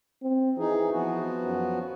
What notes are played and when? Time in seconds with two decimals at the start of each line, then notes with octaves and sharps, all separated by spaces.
0.23 C4
0.58 E3 D#4 G#4
0.91 F3 B3 F#4
1.44 F#2